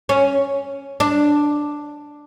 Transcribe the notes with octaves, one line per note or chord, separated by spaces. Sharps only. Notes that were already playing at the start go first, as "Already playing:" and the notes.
C#4
D4